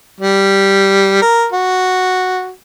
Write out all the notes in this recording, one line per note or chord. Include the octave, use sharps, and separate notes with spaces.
G3
A#4
F#4